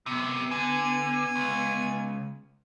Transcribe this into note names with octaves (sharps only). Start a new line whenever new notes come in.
F#2 C3 B3
D3 G#5
C#2